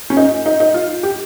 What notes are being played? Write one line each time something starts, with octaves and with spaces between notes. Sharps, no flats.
C#4
D#4
D#4
D#4
F4
G4